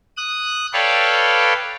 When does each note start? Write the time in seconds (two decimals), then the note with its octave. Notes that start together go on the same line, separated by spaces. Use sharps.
0.17 D#6 F#6
0.73 A4 B4 C#5 D5 F5 G5